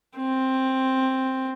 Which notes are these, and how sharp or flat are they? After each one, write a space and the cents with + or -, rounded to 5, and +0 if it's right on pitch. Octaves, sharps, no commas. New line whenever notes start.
C4 +5